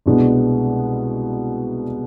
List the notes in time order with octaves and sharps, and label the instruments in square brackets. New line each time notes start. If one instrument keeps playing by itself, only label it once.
[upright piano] C2 B2 G#3 B3 D4